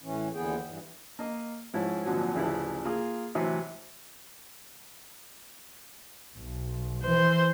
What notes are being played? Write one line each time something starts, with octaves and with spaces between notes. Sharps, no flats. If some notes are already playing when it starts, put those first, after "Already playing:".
A2 E3 C#4
D#2 D3 E3 B3 G#4 G5
G2 E3
A#3 D#5
G#2 F3 C#4 E4
G#1 A#2 D3 F3 F#3 G#5
A1 D2 C#3 F3 E4 B4
A#3 F4 G#4
A2 C3 E3 F#3
B1
E3 C5